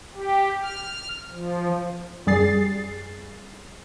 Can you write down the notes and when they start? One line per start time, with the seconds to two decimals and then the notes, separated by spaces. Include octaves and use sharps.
0.15 G4
0.63 F6
1.31 F3
2.27 F#2 G3 G#4 A6 C7